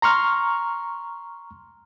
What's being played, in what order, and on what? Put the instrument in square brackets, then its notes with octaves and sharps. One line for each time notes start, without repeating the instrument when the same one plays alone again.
[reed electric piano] A#5 C6 C#6 F6